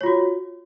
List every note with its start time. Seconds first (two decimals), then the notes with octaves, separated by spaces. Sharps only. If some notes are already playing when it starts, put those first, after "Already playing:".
0.01 C#5
0.03 F4
0.06 F#4